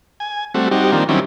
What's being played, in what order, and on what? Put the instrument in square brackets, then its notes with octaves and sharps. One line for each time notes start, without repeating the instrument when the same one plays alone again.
[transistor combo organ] G#5
G3 A3 C4 F#4
G3 C4 D#4 F#4 G4
D#3 F3 A#3 C4 D4
D#3 F#3 G3 C4 C#4 E4